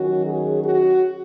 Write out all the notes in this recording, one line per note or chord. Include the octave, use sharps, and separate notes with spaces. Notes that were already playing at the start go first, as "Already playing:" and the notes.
Already playing: D#3 F#3 C#4 F#4
G#4
F#4